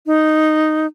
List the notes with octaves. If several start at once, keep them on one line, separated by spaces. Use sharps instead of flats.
D#4